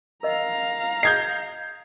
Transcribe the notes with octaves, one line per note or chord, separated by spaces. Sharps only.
A#4 D#5 F5 A#5
D#5 D#6 G6 G#6 C7